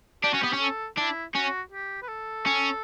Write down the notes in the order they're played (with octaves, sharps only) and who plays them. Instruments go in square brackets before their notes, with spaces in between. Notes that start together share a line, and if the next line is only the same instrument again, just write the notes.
[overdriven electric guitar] D4 [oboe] G4
[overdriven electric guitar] C#4 [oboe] F#4
[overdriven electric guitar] B3 [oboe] G4
[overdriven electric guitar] C#4
[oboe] A4
[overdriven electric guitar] D4 [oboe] E4
[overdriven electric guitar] C#4 [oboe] F#4
[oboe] G4
B4
A4
[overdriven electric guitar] C#4